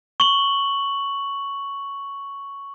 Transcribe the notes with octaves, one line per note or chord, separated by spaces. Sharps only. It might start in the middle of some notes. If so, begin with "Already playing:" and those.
C#6 F#7